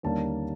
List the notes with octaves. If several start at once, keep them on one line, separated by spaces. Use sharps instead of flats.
D#2 D3 G3 A#3 C#4 A5